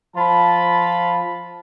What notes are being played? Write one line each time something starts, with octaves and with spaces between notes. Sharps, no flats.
F3 F4 A5 B5